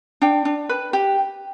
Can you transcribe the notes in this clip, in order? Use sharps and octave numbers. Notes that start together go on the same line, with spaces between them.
D4 G5
D4
B4
G4